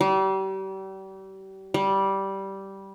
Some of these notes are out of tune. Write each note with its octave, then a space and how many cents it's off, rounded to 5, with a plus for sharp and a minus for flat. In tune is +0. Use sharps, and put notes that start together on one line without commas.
G3 -35
G3 -10